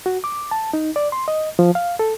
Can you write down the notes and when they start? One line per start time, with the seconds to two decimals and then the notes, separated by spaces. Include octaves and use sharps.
0.06 F#4
0.24 D6
0.51 A5
0.73 D#4
0.96 D5
1.12 C6
1.28 D#5
1.59 F3
1.75 F5
1.99 A4